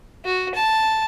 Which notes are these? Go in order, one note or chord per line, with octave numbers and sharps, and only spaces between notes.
F#4
A5